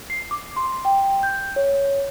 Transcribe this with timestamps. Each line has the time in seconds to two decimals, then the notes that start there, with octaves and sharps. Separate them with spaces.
0.10 C7
0.31 D6
0.56 C6
0.85 G5
1.23 G6
1.56 C#5